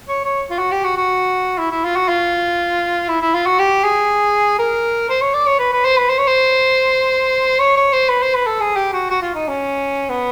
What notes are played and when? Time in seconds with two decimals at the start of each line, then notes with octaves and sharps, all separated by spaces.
0.09 C#5
0.25 C#5
0.51 F4
0.59 F#4
0.71 G4
0.84 F#4
0.97 F#4
1.58 E4
1.71 E4
1.84 F4
1.96 F#4
2.08 F4
3.09 E4
3.21 E4
3.34 F4
3.46 F#4
3.59 G4
3.84 G#4
4.59 A#4
5.10 C5
5.22 C#5
5.34 D5
5.46 C#5
5.59 B4
5.72 B4
5.85 C5
5.97 B4
6.10 C5
6.18 C#5
6.27 C5
7.59 C#5
7.77 C#5
7.93 C5
8.09 B4
8.22 C5
8.35 B4
8.47 A4
8.60 G#4
8.76 G4
8.93 F#4
9.10 F#4
9.22 F4
9.35 D#4
9.48 C#4
10.10 B3